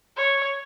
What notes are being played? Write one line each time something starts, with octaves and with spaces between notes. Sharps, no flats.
C#5